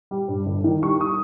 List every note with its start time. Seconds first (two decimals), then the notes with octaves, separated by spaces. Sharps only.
0.11 G3
0.28 G2
0.46 G1
0.64 D#3
0.82 G3 C#6
1.01 D#6